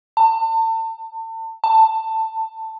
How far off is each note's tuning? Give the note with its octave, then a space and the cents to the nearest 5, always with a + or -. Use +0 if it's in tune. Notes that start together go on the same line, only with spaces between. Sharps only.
A5 +35
A5 +15